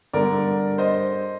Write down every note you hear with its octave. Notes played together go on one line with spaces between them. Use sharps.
G2 D3 A#4 D5
C5 D#5